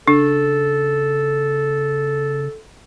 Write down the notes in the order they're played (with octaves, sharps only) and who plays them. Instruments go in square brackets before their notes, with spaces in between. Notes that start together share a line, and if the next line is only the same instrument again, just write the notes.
[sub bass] C#3 [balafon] D4 [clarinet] A4